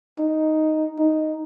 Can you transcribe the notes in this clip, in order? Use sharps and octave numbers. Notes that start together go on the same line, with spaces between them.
D#4
D#4